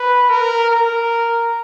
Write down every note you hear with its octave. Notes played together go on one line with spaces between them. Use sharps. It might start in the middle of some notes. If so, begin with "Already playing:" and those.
Already playing: B4
A#4
A#4